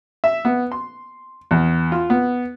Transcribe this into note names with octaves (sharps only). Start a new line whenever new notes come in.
E5
B3
C6
E2
F4
B3